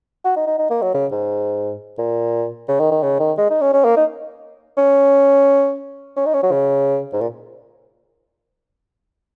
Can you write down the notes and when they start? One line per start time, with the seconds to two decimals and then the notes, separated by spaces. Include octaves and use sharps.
0.25 F#4
0.36 D#4
0.47 D#4
0.58 D#4
0.71 A#3
0.82 F#3
0.94 C#3
1.12 G#2
1.98 A#2
2.69 C#3
2.80 D#3
2.92 D#3
3.03 C#3
3.20 D#3
3.38 G#3
3.50 D#4
3.61 C#4
3.73 C#4
3.85 A#3
3.96 D#4
4.77 C#4
6.16 C#4
6.26 D#4
6.34 C#4
6.43 F#3
6.51 C#3
7.13 G#2
7.21 A#2